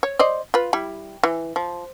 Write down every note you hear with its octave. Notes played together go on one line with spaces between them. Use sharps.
C#5
C5 D5 D#5
F4 B4
G3 E4
E3
F3